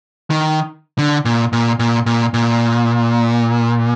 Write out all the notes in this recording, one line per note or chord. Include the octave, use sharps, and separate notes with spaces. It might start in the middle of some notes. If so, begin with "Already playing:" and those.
D#3
D3
A#2
A#2
A#2
A#2
A#2